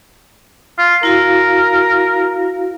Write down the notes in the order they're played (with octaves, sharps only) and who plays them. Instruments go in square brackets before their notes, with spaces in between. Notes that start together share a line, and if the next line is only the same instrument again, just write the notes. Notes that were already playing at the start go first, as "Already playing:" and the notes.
[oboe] F4
[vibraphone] E4 F#4 F5 [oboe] A#4